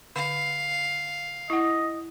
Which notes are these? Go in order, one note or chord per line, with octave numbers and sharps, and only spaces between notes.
D3 F5
E4 D#5 F#5